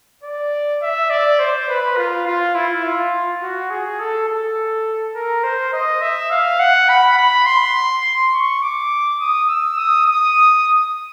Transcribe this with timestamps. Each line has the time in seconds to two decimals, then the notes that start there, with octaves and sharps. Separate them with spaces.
0.23 D5
0.82 E5
1.10 D5
1.39 C5
1.69 B4
1.97 F4
2.26 F4
2.55 E4
2.83 F4
3.42 F#4
3.70 G#4
4.00 A4
4.29 A4
5.15 A#4
5.44 C5
5.73 D#5
6.02 E5
6.31 F5
6.60 F#5
6.89 B5
7.18 B5
7.46 C6
8.33 C#6
8.62 D6
9.20 D#6
9.49 E6
9.78 D#6
10.06 D#6